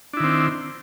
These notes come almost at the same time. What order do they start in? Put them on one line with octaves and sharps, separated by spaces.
D4 E4 D#3 C4